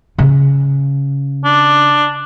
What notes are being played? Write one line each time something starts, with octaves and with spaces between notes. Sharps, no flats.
C#3
D4